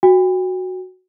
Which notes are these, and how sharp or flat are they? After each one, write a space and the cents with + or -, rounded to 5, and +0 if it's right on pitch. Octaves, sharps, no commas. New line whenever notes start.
F#4 +0 G5 +40